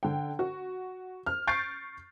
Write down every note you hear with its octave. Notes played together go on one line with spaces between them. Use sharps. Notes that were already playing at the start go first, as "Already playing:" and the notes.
D3 G5
F#4
F6
C#6 G6 A6 C7 D7